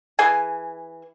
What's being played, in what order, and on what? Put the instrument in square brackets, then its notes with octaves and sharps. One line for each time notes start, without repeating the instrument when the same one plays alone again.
[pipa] E3 G#4 G#5